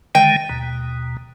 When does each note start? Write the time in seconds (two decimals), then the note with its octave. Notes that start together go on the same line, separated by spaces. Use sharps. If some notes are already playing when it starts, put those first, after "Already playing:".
0.15 D3 D#3 G#3 G5
0.49 D#2 B2